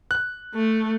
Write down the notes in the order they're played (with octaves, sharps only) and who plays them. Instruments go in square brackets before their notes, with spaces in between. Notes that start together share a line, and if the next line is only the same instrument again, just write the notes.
[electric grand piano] F#6
[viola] A3